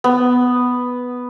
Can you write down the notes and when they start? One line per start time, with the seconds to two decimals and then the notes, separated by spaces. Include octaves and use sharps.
0.04 B3